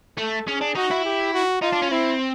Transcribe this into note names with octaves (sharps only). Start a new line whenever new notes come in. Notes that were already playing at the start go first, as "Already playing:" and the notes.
A3 A4
C#4 G#4
D4
D#4 F#4
E4
G4
F#4
D#4 F4
D4
C#4
C4 E4